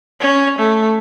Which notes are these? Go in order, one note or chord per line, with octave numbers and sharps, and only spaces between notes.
C#4
A3